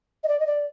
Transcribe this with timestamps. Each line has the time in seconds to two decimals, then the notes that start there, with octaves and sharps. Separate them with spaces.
0.23 D#5
0.28 D5
0.40 D#5
0.46 D5